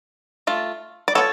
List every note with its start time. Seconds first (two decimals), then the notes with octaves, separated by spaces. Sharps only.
0.47 A3 F4
1.08 D5
1.15 B3 F4 A4 C#5